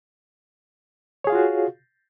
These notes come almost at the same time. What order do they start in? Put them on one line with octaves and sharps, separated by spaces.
C#5 G#4 F5 F4 F#4